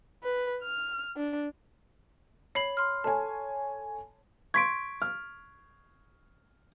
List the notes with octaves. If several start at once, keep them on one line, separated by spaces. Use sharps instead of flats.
B4
F6
D4
C#5 B5 C7 F#7
C6 F6
A4 C#5 G#5 A5
C6 C#6 G#6 B6 D7
F6